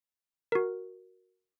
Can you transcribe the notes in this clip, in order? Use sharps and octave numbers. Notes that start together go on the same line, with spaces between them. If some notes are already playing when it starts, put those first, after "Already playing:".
F#4 A#4